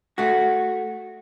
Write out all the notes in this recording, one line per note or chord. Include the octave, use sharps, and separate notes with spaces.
A3 F#4